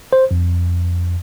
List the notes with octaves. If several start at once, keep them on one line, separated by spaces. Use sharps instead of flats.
C5
F2